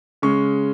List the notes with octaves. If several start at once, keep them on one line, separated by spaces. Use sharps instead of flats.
C#3 G#3 C#4 C#6